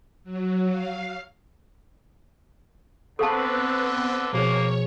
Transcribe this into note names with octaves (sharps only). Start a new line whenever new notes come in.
F#3
F5
D3 B3 C4 A4 B4 F5 A5 C#6
B2 F3 A#3 G#4 C#5